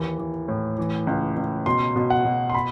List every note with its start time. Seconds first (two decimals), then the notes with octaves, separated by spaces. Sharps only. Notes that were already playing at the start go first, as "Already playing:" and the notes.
Already playing: D#2 E3
0.19 E3
0.48 A2
0.78 E3
1.07 C#2
1.37 C#2
1.66 B2 C6
1.96 B2
2.10 F#5
2.25 B2
2.50 C6
2.54 B5